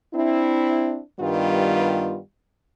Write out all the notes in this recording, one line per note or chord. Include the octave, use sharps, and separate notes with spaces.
C4 D4 E4
G2 D#3 G3 B3 F4